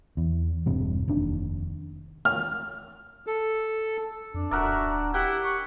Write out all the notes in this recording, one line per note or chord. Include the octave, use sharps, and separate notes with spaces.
E2
E1 G2 C3 G3
F1 D#2 D4
F6
A4
F2 D4
D1 F#4 A#4 D5 E5
E4 G4 F#5 G5
C#6